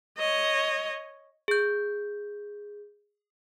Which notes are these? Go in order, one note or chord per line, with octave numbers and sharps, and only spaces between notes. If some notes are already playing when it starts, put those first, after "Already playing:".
C#5 D#5
G#4 G6